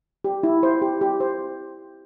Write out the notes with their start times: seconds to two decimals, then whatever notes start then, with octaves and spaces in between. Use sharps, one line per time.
0.25 G4
0.43 E4
0.63 C5
0.82 G4
1.01 G4
1.20 C5